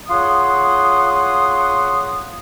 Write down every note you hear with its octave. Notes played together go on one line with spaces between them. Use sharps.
F4 G#4 C#5 F#5 C6 D#6